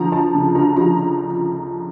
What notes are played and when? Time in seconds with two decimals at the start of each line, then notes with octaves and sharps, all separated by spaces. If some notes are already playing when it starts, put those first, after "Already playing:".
Already playing: D2 F3 A#5
0.12 D2 A5
0.34 C#3
0.55 D2 A#5
0.77 F3 A#5